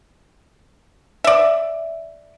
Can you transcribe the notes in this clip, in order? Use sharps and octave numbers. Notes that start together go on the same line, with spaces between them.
D5 E5